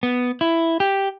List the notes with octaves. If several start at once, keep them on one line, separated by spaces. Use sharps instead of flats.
B3
E4
G4